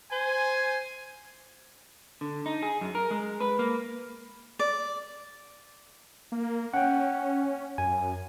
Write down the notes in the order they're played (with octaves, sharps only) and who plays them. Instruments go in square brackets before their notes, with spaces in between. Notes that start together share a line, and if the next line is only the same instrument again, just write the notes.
[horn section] C5 G#5
[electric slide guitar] D3
D#4
G#4
F#2
A#4
G#3
B4
A#3
[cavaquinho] D5
[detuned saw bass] A#3
[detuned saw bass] C#4 [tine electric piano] F#5 G5
[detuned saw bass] F#2 [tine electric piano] G#5